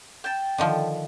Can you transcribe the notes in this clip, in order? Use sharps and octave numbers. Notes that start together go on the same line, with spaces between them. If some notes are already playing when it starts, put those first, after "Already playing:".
G5 A5
D3 D#3 F3